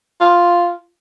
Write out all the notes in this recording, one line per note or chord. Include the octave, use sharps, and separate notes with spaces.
F4